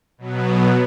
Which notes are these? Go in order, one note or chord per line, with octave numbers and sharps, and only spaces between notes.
B2 F#3 B3